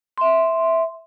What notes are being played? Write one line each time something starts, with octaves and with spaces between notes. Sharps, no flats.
E5 C6